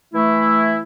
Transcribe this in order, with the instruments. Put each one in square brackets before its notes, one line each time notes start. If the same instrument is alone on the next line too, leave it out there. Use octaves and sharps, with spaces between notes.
[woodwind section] E3 A3 E4